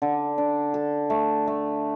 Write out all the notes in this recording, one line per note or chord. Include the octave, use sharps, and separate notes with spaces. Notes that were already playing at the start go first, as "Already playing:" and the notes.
D3
D4
A4
A3
A3